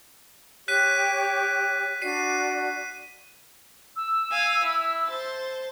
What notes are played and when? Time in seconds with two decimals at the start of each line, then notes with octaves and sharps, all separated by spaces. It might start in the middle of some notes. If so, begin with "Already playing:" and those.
0.68 G4 C#5 G5 F#6 B6 D#7
2.02 D4 F#4 D5 C7 D#7
3.96 E6
4.31 F5 G#5
4.63 E4
5.07 C5 A5